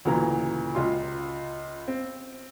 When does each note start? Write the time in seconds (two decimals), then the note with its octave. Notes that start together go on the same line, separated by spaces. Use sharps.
0.05 D2 A#2 C#3 E3 A#5
0.75 C#2 F4 C6
1.88 C4